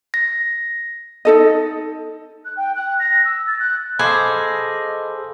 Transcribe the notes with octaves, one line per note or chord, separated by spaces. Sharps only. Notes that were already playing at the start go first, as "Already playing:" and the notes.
A#6
D#4 A4 D#5
F#6
G5
F#6
A#6
E6
A6
F#6
G#4 A4 C5 D#5 F5 B5 D6 E6